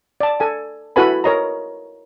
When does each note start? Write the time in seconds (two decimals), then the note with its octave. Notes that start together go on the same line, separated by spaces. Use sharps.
0.20 D5 A5
0.40 A4 G#5
0.96 E4 F#4 A4 B4 G#5 B5
1.24 A#4 C#5 D#5 A#5